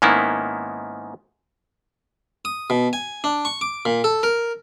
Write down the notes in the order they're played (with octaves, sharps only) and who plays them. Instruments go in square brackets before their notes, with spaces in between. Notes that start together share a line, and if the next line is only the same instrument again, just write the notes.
[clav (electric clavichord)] G#2 D#3 A#3 B3 C#4 E4
[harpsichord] D#6
B2
G#5
D4
C#6
D6
A#2
A4
A#4